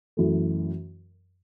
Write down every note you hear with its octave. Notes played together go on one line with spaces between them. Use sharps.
F#2 E3 A3